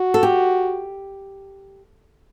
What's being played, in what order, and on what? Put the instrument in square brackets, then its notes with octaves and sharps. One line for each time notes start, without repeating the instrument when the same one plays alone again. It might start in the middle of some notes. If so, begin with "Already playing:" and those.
Already playing: [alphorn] F#4
[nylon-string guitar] A4
G4